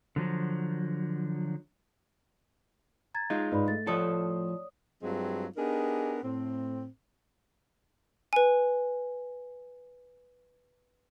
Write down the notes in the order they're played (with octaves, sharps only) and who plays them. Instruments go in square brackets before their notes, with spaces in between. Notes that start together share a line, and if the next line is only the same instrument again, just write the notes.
[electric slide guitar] D3 F3 F#3
[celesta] A#5 G#6 A6
[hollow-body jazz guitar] G#3 D#4 F4
[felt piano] G#2 [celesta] B4 D5 B5
[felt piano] A3 [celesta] A6
[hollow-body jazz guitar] A2 F3 A4 [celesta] C#5 D5 D#6
[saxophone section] G2 F#3 G#3 C4 F4
B3 D4 D#4 G4 G#4 A#4
A2 C4
[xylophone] B4 G#5